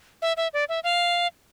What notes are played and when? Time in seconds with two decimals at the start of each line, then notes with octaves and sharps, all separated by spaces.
0.22 E5
0.37 E5
0.54 D5
0.69 E5
0.84 F5